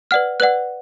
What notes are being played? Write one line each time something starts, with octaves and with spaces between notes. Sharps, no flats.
B4 D5 F#5 F6
B4 D5 F#5 F#6